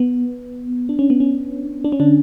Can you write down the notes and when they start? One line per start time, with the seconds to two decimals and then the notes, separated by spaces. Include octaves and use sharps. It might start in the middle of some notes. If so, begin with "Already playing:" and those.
Already playing: B3
0.89 D4
0.99 C#4
1.10 B3
1.20 C#4
1.84 D4
1.92 C#4
2.00 D3 D4